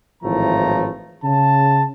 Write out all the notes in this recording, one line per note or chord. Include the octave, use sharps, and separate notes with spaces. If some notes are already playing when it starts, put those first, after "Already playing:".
G#1 A2 E3 F3 A3 A#5
C#3 A5